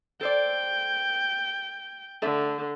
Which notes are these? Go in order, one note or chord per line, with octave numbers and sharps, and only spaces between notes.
A4 C5 D5 G5
D3 A3 A4 E5